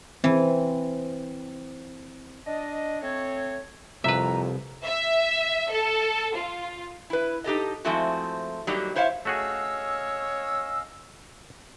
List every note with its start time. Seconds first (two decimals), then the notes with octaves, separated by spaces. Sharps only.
0.24 E3 C4
2.46 D4 D#5
3.02 A3 C4 C#5
4.04 C2 F2 B4 E5 A#5
4.83 E5
5.72 A4
6.35 F4
7.10 E4 B4
7.44 D#4 G4 A4 D#5
7.85 F3 G#3 A3 C4 E4 F#4
8.67 F#3 G3 A#3 D#4 F#4 G4
8.96 E4 C5 C#5 E5 F5
9.25 A3 C#4 F#4 G#4 C#5 D#5 F5 E6